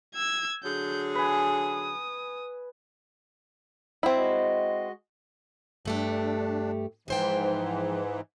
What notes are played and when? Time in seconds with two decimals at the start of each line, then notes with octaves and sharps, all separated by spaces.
0.15 E6 G#6
0.64 D3 F#3 G#4 G6
1.15 B4 G#5 D#6
4.03 C4 E4
4.16 G#3 F#4 D#5
5.85 G2 A3 D4 G4
7.08 G#2 E3 F3 C5 G5